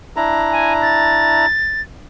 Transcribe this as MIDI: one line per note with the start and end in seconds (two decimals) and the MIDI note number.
0.16 1.46 62
0.16 1.46 64
0.16 1.46 82
0.52 0.74 80
0.82 1.81 93